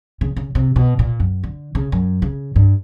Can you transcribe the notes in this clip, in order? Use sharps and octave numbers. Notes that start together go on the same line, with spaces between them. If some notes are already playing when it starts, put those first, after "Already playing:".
C#3
C#3
C3
B2
A#2
F#2
D3
C#3
F#2
C#3
G2